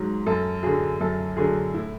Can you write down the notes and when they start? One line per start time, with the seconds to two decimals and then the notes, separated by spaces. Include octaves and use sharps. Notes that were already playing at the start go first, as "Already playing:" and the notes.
Already playing: G#2 F#3
0.26 F#2 A4
0.63 D3 F#3 G#4
1.00 F#2 A4
1.37 D3 F#3 G#4
1.74 A2 E4